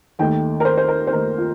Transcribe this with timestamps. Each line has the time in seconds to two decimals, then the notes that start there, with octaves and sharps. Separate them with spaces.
0.19 D#2 D#3 A3 G5
0.60 A#4
0.65 C5
0.78 C5
0.88 A#4
1.07 C5
1.12 D#2 D#3 A3 A#4
1.38 F4